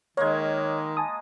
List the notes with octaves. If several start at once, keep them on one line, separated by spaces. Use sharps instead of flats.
D#3 G#3 A#3 C#5 G#6
G#5 A5 D#6